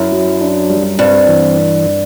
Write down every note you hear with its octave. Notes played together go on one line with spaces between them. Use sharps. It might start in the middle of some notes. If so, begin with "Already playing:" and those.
Already playing: F#2 E4
F#3
D4
G3
G2 C4
E3